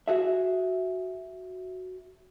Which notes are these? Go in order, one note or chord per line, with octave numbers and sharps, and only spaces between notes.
F#4 G#4 E5